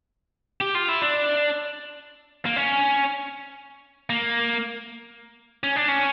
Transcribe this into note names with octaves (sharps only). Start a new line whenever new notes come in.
G4
F4
E4
D4
A#3
C#4
A#3
C#4
D4
C#4